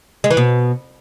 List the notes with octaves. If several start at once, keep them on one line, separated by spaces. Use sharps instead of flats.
G#3
E3
B2